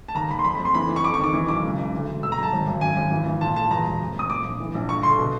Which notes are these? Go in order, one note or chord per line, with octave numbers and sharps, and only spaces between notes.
A5
D#2 A#5
D#2 B5
C6
F2 B5
B5
F2
C6
E3 B5
E3
C#6
F2 D6
C#6
D#3 D6
E3
B1 D6
C#2
C#2
D2
E1
B2 E6
A#5
B1
A5
G#1
G#1
F#2 G#5
G#1
E3
E3
A#2 A5
A#2 A5
E2 A#5
E1
F1
F1 D#6
A#2 D6
A#1
E3
A#1
G2 C#6
D3 C6
B2